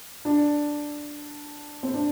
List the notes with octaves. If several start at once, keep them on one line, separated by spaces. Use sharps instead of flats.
D4
C4
D4